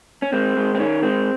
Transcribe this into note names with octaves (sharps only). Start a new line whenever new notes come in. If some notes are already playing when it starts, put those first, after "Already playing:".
C#4
G#3 C4
G#3
C4
D#3 C#4
G#3 C4